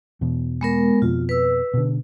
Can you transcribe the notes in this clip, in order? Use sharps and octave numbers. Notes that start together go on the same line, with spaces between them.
E2 B2
G#3 B3 A#4
F2 B2 F4
B4 E6
B2 D3